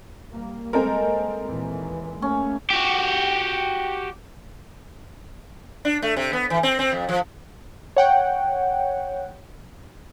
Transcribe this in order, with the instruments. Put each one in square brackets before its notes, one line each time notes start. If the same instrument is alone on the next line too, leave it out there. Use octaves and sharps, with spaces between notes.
[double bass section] G3 A#3
[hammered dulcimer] G#3 [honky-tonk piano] C4 A4 A#4
[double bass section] D#2 A#2 E3
[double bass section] A3 A#3 [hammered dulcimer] C#4
[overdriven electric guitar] F#4 G4
[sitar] D4
A3
C3
B3
E3
C4
C4
F2
F3
[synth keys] C#5 F#5 G5